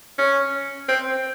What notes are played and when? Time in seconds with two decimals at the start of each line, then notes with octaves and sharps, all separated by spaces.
0.18 C#4
0.89 C4